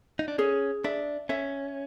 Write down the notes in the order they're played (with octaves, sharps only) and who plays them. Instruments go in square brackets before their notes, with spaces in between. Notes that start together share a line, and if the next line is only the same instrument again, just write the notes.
[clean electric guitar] D#4
D4
[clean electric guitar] C#4 [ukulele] G#4
[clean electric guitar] D4 [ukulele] E5
[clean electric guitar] C#4 [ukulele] E5